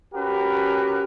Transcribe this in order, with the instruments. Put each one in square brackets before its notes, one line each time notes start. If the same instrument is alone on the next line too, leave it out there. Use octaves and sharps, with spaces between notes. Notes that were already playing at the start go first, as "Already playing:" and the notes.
[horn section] C#4 F#4 G4 A#4 B4